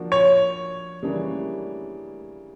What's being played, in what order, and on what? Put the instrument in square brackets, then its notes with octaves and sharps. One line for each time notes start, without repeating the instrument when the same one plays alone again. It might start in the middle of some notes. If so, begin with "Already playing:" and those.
Already playing: [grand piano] F3 A#3 D4 F#4 A#4
[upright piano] C#5
[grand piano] C#3 E3 G3 A#3 D4